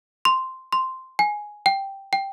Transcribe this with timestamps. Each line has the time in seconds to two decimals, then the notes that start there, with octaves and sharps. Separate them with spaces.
0.25 C6
0.73 C6
1.19 G#5
1.66 G5
2.13 G5